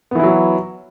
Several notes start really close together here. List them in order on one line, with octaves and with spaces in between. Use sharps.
B3 E3 E4 F#3